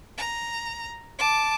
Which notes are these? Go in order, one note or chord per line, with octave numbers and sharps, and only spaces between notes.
A#5
A5 D6